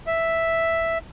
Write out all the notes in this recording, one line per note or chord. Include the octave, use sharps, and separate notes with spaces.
E5